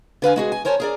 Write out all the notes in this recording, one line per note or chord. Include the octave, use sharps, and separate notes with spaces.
D3 B4 F5 G#5
G#3 F#4 G#4
G#5
A#4 C5 C#5 G#5 A5
G#4 A#4 D5